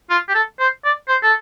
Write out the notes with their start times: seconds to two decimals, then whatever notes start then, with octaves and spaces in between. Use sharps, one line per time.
0.10 F4
0.29 G4
0.35 A4
0.60 C5
0.85 D5
1.08 C5
1.23 A4